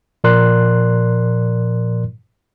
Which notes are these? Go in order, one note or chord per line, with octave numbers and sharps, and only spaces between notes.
A#2 F3 A#4 D5 C6 F#6